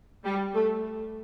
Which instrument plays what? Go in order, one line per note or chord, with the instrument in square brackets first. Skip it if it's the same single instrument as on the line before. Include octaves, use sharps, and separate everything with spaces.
[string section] G3
A3